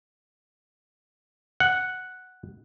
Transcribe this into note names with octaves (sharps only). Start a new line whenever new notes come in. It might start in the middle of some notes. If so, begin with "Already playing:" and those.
F#5